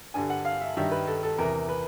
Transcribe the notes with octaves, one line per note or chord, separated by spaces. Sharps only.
G2 D3 G3 G#5
F#5
F5
E5
G2 D#3 G3 E5
B4
A4
A4
E2 C3 E3 A#4
B4